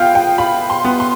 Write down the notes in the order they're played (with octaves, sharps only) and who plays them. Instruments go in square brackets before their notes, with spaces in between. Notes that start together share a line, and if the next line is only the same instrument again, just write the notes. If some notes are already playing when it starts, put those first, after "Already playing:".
Already playing: [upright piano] B3 F4 [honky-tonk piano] F5 G5
[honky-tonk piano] G5
[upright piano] F4 [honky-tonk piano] B5
[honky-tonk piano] C6
[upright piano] B3
[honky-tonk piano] C6